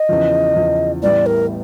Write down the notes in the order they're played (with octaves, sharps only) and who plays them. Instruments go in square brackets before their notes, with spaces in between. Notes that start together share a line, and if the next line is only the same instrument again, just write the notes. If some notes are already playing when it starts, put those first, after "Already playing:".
Already playing: [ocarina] D#5
[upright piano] E2 C#3 F3
E2 C#3 F3
[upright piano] A1 A2 E3 G3 B3 [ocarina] D5
[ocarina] A#4